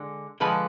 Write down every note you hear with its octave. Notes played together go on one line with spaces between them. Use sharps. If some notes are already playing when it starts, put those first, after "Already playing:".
Already playing: D3 G#3
D3 F3 G#3 B4